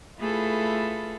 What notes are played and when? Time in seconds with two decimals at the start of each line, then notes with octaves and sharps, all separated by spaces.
0.19 A3 E4 F4 G#4 A4 B4